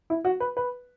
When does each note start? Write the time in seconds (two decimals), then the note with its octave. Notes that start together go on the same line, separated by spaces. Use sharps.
0.10 E4
0.25 F#4
0.40 B4
0.57 B4